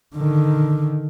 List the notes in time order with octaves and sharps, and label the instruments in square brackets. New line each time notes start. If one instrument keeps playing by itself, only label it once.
[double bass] D3 D#3